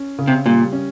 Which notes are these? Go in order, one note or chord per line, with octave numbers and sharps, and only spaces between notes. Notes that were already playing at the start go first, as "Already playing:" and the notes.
Already playing: C#4
C#3
C3
A#2 G3
C#4